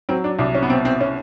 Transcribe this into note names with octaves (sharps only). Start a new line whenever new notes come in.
F#3 C4
D4
C2 D4
C#4
B3
B2 C4
C4
C#4